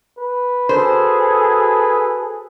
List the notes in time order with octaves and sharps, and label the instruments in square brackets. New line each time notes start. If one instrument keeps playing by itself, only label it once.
[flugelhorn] B4
[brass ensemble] F#4 G#4 A4 [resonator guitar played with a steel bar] C5